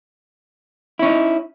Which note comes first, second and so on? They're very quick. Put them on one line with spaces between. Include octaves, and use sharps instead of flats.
E4 C#4 D#4